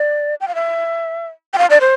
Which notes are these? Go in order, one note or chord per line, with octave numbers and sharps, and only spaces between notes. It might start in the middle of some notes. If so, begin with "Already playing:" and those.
Already playing: D5
G5
F5
E5
G5
F5
D5
C5